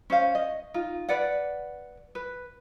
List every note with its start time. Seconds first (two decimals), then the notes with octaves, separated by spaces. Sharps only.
0.10 C#4 C5 F5
0.35 D#5
0.74 D#4 F4
1.09 B4 D5 F#5
2.15 B4